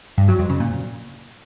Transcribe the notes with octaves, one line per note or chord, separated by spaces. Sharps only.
G2
F#3
F2
C#3
A#2